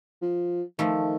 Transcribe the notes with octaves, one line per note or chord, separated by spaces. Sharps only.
F3
D#3 F3 A3